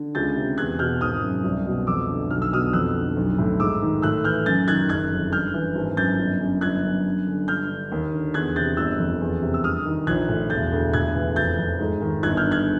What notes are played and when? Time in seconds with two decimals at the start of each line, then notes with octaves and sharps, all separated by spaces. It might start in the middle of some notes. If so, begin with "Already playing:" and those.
Already playing: D3
0.15 C#2 G6 A6
0.36 C3
0.58 E2 F#6 G#6
0.79 B2 F6 G6
1.01 G#1 D#6 F6
1.23 F#2
1.44 C2
1.66 B2
1.87 F2 D6 E6
2.09 D3
2.30 B1 F6
2.42 E6
2.52 B2 D#6 F6
2.73 F2 E6 F#6
2.95 D3
3.17 B1
3.38 A2
3.60 G#2 D6 E6
3.82 D#3
4.02 A2 E6 F#6
4.24 E3 F6 G6
4.46 F#2 G6 A6
4.68 D#3 F#6 G#6
4.89 F#1 F#6 G#6
5.11 F2
5.32 G2 F6 G6
5.54 E3
5.75 G#1
5.97 F#2 G6 A6
6.19 G1
6.40 F#2
6.61 G1 F#6 G#6
6.84 F#2
7.05 G2
7.27 D3
7.48 G2 F6 G6
7.70 D3
7.91 D#2
8.13 D3
8.34 E2 F#6 G#6
8.56 C3 G6 A6
8.77 G1 E6 F#6
8.99 F2
9.21 E2
9.42 C3
9.54 E6
9.64 G2 D#6 F6
9.86 D#3
10.07 A#1 F#6 G#6
10.29 A2
10.50 E1 G6 A6
10.72 D2
10.93 A2 F#6 G#6
11.15 E3
11.36 F1 G6 A6
11.58 F2
11.79 G#2
12.01 D#3
12.23 G1 F#6 G#6
12.37 F6 G6
12.44 G2
12.51 F#6 G#6